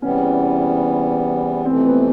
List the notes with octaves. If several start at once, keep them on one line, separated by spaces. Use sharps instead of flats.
E2 C3 E3 G3 B3 C#4
F2 C3 E3 A3 C4
B3